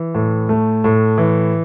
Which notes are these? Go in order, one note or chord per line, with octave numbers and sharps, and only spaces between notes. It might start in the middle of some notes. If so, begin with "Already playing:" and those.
Already playing: E3
A2
A3
A2
E3